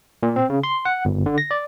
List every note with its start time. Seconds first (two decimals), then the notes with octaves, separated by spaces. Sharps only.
0.23 A#2
0.36 C4
0.50 C#3
0.63 C6
0.85 F#5
1.05 G1
1.26 D3
1.38 A#6
1.51 D5